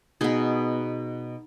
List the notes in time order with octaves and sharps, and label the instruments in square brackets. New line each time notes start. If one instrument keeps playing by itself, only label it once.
[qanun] B2 B3 D#4 G#4